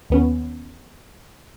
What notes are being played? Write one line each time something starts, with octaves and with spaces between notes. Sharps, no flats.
D#2 B3 C#4